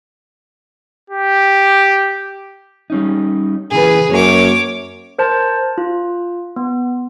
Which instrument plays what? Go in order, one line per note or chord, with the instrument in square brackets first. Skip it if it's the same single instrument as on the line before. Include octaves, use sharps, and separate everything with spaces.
[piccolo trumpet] G4
[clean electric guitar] G3 C#4 D#4
[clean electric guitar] A#2 C#3 E3 [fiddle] G#4 B4
[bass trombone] F#2 [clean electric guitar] A#3 [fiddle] C#5 D6
[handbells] A#4 C5 A5
F4
B3